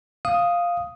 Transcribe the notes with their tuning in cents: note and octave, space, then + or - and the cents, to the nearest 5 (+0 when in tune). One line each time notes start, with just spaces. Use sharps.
F5 +0 D#6 +0